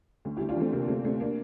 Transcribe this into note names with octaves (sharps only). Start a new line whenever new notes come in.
D2
D2 E4 G4
D4 F4
E3 A3 C4
C3 A#3
D2 A3 C4
D2 A3 C4
A#3 D4